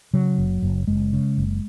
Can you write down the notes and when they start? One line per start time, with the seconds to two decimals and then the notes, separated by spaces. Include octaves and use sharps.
0.13 C#3 F#3
0.38 F#1
0.62 F#1
0.87 F#1 G#3
1.13 C#3
1.38 F#1